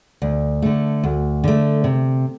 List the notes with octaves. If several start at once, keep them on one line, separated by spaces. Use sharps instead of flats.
D2
D3 A3
D2
D3 A3
C3